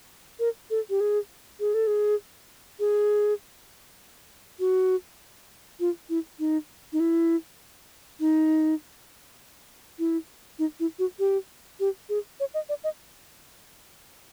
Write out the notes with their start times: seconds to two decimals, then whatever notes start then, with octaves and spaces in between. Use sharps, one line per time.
0.39 A#4
0.70 A4
0.90 G4
1.00 G#4
1.60 G#4
1.74 A4
1.87 G#4
2.80 G#4
4.60 F#4
5.80 F4
6.09 E4
6.39 D#4
6.93 D#4
7.00 E4
8.20 D#4
9.99 E4
10.59 D#4
10.80 E4
10.99 F#4
11.19 G4
11.80 G4
12.09 G#4
12.40 C#5
12.54 D#5
12.69 D5
12.84 D#5